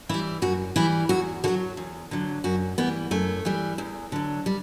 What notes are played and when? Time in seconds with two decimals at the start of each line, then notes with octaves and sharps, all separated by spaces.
0.09 E3 G3 E4
0.42 F#2 F#4
0.76 E3 G3 E4
1.09 E2 F#4
1.44 D3 F#3 F#4
1.77 E2
2.11 D3 F#3
2.44 F#2 F#4
2.78 E3 G3 B3
3.11 F#2 A3
3.45 E3 G3
3.78 E2
4.12 D3 F#3
4.46 G3